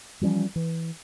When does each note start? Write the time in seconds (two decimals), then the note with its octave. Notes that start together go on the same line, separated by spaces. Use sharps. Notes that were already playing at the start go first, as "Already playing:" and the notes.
0.21 E3 F3 G3 C#4
0.56 E3